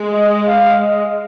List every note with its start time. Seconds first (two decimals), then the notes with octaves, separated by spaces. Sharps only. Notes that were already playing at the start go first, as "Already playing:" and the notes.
Already playing: G#3
0.13 D#5
0.47 F5
0.81 D#5